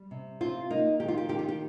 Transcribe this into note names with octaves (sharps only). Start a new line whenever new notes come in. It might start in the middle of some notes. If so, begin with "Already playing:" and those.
Already playing: G3
C3
C4 F4
A#3 D#4
D#3 G4
F4
G4
D#3 G4
F4
G4